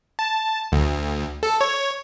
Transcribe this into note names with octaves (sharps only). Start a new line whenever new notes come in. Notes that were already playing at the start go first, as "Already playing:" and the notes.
A5
D2
A4
C#5